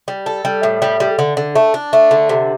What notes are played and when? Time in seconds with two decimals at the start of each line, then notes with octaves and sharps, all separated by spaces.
0.08 G3
0.26 A4
0.45 G3
0.63 A2
0.82 G3
1.00 G3
1.19 D3
1.37 D3
1.56 A3
1.74 D4
1.93 A3
2.11 D3
2.29 C3